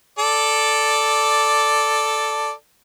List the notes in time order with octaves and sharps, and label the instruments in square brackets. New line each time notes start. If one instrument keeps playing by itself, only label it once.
[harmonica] A4 D5